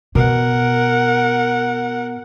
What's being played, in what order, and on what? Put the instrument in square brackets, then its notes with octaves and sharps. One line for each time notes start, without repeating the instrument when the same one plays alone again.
[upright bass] B2 [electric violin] A#4 F#5